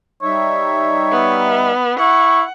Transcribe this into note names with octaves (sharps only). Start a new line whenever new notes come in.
G3 D#4 C#5 E5
B3
E4 F#5 C#6